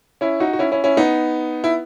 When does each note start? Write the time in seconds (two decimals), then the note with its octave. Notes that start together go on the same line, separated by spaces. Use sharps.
0.21 C#4 E4
0.40 D#4 F#4
0.53 F#4
0.59 C#4 E4
0.71 C#4 E4
0.84 C#4 E4
0.97 B3 D#4
1.64 E4